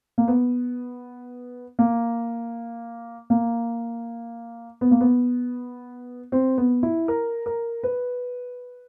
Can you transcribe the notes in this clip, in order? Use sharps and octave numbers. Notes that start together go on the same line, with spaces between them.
A#3
B3
A#3
A#3
B3
A#3
B3
C4
B3
E4
A#4
A#4
B4